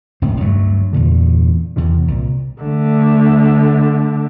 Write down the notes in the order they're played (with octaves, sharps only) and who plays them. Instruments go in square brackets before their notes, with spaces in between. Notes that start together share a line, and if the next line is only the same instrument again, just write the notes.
[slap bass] F1 C#2 A2 C4
D2 G2 F#3 A3
E2 G2 A#2 D3
E2 C3 D#3
C2 A#2
[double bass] D3 A3